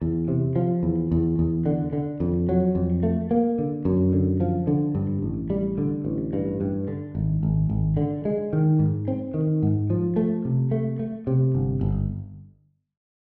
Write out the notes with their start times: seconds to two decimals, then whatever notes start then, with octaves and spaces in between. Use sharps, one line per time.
0.02 E2
0.28 C3
0.56 F3
0.83 E2
1.12 E2
1.39 E2
1.66 D3
1.93 D3
2.20 F2
2.49 F#3
2.75 F2
3.03 A3
3.31 A#3
3.59 D3
3.85 F#2
4.13 D3
4.40 F3
4.67 D3
4.95 G2
5.22 A1
5.50 G3
5.78 D3
6.05 A1
6.33 G2
6.61 G2
6.88 D3
7.15 G#1
7.43 G#1
7.70 G#1
7.97 D3
8.25 G#3
8.53 D#3
8.79 G#2
9.08 C4
9.34 D#3
9.63 G#2
9.90 F3
10.16 A3
10.45 C3
10.71 A3
10.99 A3
11.27 C3
11.55 G1
11.81 G1